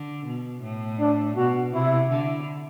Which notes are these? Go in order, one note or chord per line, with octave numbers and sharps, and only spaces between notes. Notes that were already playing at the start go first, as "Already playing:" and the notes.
Already playing: D3
B2
A2
D4
B2 F#4
C3 E4
D3